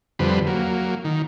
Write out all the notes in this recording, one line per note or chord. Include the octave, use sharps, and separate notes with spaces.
F2 D3 G3 B4 C5
F#3 A#3
D#3